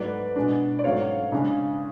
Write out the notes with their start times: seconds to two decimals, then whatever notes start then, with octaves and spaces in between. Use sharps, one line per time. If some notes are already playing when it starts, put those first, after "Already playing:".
Already playing: G#2 F#3 A3 B4 D5
0.36 B2 G#3 D4
0.79 D5
0.84 G#2 F#3 A3 C#4 C#5 F5
1.32 C#3 G#3 D4